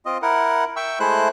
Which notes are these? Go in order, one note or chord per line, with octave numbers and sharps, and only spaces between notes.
C4 F4 D#5
E4 A#4 F#5
E5 G5 C#6 E6
G#3 A3 E4 C5 F#6